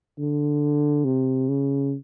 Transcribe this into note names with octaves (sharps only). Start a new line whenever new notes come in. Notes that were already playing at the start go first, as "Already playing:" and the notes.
D3
C3
C#3